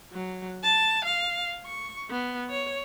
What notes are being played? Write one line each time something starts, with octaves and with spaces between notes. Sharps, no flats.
F#3
A5
F5
C#6
B3
C#5